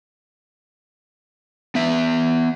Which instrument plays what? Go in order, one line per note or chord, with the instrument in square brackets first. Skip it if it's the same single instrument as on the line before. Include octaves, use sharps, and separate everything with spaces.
[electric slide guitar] B3 E5